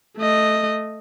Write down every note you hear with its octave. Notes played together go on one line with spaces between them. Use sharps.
A3 D#5